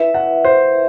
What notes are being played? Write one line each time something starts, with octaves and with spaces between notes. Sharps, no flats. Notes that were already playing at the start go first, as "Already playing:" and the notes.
Already playing: E4 B4 E5
F#5
C5